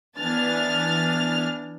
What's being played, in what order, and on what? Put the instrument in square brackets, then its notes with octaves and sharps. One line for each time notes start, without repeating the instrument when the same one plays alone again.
[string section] E3 B3 D4 G#5 F6 A6